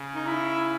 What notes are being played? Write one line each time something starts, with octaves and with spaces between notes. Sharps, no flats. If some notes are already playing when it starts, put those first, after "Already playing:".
Already playing: C#3
D#4
E4